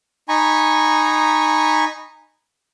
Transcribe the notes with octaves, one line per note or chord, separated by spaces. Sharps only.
D#4 G#5 A#5 B5 C#6